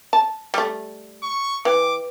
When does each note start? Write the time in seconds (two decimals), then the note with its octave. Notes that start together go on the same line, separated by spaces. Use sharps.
0.13 A5
0.54 G3 A3 E6
1.23 C#6
1.65 E3 B4 G5 D6